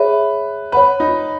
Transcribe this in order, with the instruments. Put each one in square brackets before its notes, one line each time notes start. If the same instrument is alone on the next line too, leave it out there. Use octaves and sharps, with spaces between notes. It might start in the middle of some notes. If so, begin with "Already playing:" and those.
Already playing: [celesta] G#4 C#5 E5 [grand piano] B4
[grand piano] B4 [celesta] C#5 F#5 B5
[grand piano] D#4